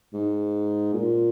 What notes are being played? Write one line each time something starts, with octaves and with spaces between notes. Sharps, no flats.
G#2
A#2